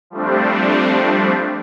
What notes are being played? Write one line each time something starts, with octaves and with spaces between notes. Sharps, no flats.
F3 G3 A3 C4 D4